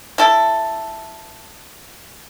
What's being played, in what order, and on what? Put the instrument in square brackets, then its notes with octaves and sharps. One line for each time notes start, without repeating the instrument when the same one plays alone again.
[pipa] E4 A4